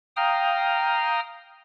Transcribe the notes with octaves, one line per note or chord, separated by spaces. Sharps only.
F5 G5 A#5 D#6 F6